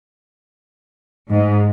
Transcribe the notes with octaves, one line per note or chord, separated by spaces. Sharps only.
G#2